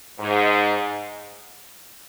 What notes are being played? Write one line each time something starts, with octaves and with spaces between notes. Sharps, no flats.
G#2